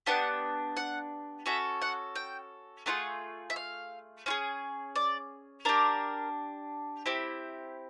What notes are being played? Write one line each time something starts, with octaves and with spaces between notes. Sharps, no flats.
B3 D4 G4 F#5
F#5
C#4 F#4 A4 E5
F#5
G5
A3 D4 F4 G#4 F#5
E5
F5
C#4 F4 G#4
D5
D4 G4 A#4
C4 E4 G4